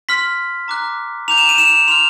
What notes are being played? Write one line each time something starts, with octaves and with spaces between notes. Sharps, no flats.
C6 F6 B6
A#5 D6 F#6
A#5 D6 G6 F7
E7
D#7
E7
C6 F6 F7